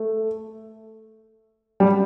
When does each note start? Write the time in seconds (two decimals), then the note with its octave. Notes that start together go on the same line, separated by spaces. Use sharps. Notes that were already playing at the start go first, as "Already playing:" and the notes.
Already playing: A3
1.80 G3